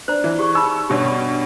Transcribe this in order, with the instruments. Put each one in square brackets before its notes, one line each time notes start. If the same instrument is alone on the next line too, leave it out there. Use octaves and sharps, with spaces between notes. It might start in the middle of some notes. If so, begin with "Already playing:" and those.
[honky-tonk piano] D4 [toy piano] C5 A#5
[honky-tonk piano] E3
[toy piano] G4 G#4 C#6
[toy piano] D#4 B5 [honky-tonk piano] C#6 E6
[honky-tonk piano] G2 B2 C#4 [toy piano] G4